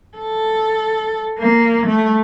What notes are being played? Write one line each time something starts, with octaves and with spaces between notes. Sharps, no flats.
A4
A#3
A3